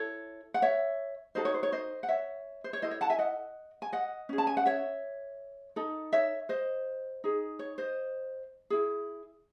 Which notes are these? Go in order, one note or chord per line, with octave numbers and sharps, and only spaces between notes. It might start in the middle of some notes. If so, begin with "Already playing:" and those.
Already playing: E4 A4 C#5
F#5
C#5 E5
D#4 F#4 A4 C5 D#5
C#5
C5
C#5
C5 D#5
F#5
C#5 E5
C5
C#5
E4 A4 C5 D#5
C#5
F#5 A5
E5 G#5
D#5 F#5
G#5
D#5 F#5
C#4 G#4
A5
G#5
F#5
C#5 E5
D#4 A4
C#5 E5
C5 D#5
D#4 G#4
C#5
C5 D#5
E4 G#4